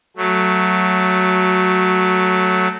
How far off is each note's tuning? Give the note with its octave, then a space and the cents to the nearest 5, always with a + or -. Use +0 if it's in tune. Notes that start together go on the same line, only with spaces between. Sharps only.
F#3 +0 A3 +0